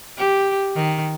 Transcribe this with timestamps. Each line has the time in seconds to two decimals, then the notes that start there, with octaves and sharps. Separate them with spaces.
0.18 G4
0.76 D#3